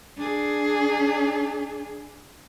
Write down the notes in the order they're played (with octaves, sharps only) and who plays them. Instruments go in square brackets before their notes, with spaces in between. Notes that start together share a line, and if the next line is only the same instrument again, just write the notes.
[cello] D4 G#4